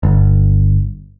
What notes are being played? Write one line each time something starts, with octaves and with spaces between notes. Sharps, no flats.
G1